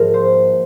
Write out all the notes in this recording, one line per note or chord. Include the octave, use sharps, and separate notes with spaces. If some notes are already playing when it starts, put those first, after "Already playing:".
Already playing: G#1 G#2 F3 A#3 A#4
C5